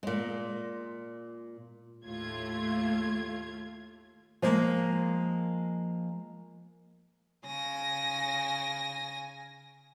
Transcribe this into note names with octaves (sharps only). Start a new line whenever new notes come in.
A#2 G#3
D#2 A2 A3 F4 G#6
F3 G#3 A#3
C#3 G#5 A#6